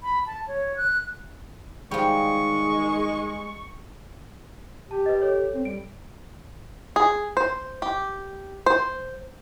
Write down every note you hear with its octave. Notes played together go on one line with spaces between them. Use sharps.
B5
A5
C#5
F#6
D#3 F3 G3 G#3 C#6
G4 A5
B4 D#5
A4 C#5
C4
G3 D7
G#4
C5
G4
C5